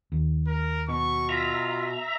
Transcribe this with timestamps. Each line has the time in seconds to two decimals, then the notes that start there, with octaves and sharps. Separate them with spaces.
0.12 D#2
0.47 A#4
0.89 B2 C#6
1.29 F4 E5 A#5